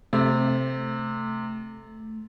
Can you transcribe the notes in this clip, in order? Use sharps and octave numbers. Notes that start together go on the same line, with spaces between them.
C3 A3